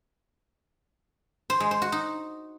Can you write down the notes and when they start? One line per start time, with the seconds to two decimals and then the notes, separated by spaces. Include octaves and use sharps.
1.50 C5
1.60 G#3
1.71 C5
1.82 F#4
1.92 D#4